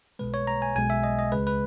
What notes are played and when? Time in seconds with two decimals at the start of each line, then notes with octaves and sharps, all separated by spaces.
0.19 B1 B2 G#3 B4
0.34 C#5
0.47 A#5
0.62 G#5
0.75 B1 B2 G#3 G#5
0.90 E5
1.04 D#5
1.19 D#5
1.32 C#2 C#3 G#3 B4
1.47 B4